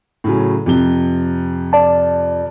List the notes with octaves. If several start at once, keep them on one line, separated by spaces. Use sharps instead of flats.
A2 C#3 F#3
F2 C3 G7
D5 A5